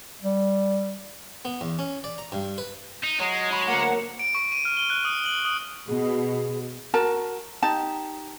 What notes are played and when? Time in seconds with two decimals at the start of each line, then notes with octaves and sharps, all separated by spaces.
0.22 G3
1.45 B3
1.61 E2
1.79 C#4
2.04 D5
2.18 A#5
2.32 G2
2.58 B4
3.04 D#4
3.20 F#3 G#3 D#5
3.52 B5 C#6
3.68 D2 A#3 F#5
4.19 D7
4.35 C#6
4.52 D#7
4.65 F6
4.77 G7
4.90 F#6
5.05 D#6
5.26 F#7
5.45 D#6
5.88 B2 G#4
6.94 F#4 A#4 A5
7.63 D#4 G4 A5